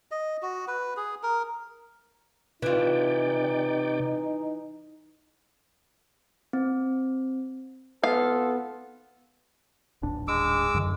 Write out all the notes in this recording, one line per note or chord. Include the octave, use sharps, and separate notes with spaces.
D#5
F#4
B4
G#4
A#4
C3 E3 D#4 F4 D5 G5
C4
G#1 B3 F4 A4 F5
D#1 A1 D4
G#3 D6 E6
F#2 D3